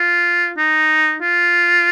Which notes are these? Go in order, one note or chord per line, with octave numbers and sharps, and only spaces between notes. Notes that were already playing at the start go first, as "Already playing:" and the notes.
Already playing: F4
D#4
F4